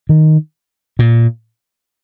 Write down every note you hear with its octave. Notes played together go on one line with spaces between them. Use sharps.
D#3
A#2